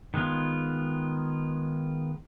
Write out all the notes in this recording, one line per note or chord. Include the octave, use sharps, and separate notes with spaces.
D#3 G#3 B3 F4